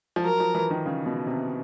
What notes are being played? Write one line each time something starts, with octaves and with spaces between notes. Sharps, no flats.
F3
F#3 A#4
F3
E3
D#3
C#3
B2
C3